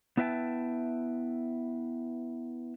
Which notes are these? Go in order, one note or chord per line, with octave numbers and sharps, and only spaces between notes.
B3 E4 B4 E5 G5 A5